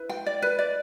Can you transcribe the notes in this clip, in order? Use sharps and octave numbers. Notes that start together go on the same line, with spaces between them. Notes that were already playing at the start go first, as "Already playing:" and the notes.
Already playing: E4 B4
G5
D5
B4
D5